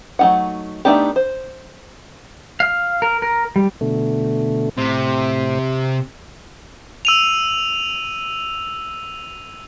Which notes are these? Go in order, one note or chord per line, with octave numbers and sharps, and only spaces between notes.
F#3 A3 C#4 D#4 F#5
A3 B3 D4 D#4 G4
C5
F5
A#4
A#4
G3
B2 D3 A3
A2 C3 C5
E6 D#7 F7